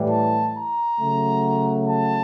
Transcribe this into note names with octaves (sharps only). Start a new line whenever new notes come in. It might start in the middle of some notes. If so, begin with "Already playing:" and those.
Already playing: A2 E3 G3
A5
A#5
C#3 F#3 A3
A5